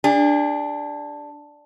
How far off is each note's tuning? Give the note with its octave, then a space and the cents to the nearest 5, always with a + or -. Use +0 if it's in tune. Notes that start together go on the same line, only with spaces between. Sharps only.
D4 +0 G#4 -40